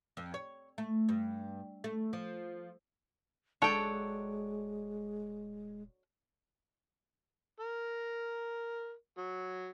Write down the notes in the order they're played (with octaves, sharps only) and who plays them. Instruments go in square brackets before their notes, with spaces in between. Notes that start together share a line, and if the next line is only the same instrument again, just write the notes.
[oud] F2
C#5
A3
G2
A3
F3
[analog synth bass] D#1 [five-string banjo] F#3 D4 A4 [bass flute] G#3 [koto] C#5 G5
[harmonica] A#4
F#3